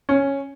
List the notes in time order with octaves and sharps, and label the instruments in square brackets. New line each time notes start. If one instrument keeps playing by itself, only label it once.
[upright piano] C#4